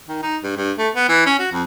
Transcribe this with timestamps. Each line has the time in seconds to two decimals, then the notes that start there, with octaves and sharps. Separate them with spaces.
0.08 D#3
0.22 D#4
0.43 G2
0.57 G2
0.78 A3
0.95 B3
1.09 E3
1.26 C#4
1.39 F#4
1.52 F2